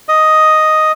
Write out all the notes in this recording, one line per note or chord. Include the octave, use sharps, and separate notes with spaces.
D#5